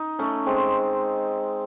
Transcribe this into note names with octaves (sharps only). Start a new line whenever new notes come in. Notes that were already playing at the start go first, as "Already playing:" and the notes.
Already playing: D#4
A3 C#4
G#3 C4